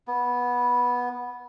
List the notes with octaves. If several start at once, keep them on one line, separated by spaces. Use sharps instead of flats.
B3